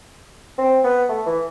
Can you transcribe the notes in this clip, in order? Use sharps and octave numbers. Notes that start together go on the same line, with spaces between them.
C4
B3
A3
E3